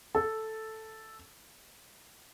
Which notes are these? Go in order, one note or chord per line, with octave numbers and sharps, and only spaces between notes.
A4